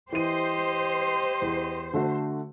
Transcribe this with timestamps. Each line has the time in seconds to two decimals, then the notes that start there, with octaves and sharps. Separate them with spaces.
0.12 E3 G4 C5 D#5 D#7
1.42 E2
1.94 D3 A3 F#4